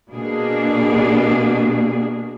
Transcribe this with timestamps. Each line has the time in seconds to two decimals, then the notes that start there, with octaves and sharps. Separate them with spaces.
0.12 B2 A#3 D4 G#4